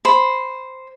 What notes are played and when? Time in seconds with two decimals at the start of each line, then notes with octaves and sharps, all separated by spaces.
0.05 C5 B5